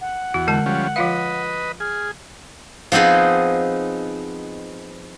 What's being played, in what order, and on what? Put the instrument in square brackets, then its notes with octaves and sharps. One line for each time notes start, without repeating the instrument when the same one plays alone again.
[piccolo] F#5
[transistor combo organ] E2 [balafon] F#4
[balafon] D3 G#3 A5
[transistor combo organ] F3 G3 C#4
[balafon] F3 F4 F5 [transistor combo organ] B4 D#5
[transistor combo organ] G#4 [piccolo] F6
[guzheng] F3 B3 C4 D#4 G#4